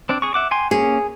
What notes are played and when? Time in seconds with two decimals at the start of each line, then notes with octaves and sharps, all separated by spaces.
0.09 C4 D4 D5
0.22 G#4 C#6
0.34 E5 F#5 D6
0.51 G5 G#5 C6
0.71 A#3 C#4 G#4